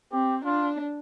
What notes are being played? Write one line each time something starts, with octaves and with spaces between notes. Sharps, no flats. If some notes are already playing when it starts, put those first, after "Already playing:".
C4 G4
D4 F4